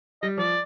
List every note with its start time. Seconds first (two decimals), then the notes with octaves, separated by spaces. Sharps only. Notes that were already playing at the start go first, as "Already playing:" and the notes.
0.22 G3 D#5
0.37 F3 D5